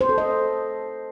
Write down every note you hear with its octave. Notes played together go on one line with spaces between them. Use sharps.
C5
A4
D#5